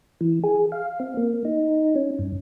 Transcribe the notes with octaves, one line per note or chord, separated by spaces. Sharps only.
E3
G#4
F5
C4
A#3
D#4
C#4
G2